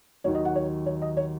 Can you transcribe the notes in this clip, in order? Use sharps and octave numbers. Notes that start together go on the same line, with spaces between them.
D#2 D#3 F#3 C#5
D#5
F#5
C#5
C#5
D#5
C#5